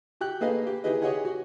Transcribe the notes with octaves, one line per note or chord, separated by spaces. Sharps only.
F#4 G4 G5 F#6
A#3 G#4 A4 B4 D#5 F5
G4
D#4 E4 G4 G#4 B4 D#5
G4 G#4 C#5 D#5 F#5 G#5
F#4